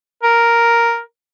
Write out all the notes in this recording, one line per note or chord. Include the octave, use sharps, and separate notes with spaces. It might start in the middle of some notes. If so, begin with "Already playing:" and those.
A#4